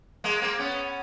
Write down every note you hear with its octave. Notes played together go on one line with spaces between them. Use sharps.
G#3 A#3
A#3 C4
B3 C#4